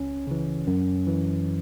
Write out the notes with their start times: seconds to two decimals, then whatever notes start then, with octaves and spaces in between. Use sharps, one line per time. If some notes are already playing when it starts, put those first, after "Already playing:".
Already playing: C#2 C#4
0.27 C#3 E3
0.67 F#2
1.07 E3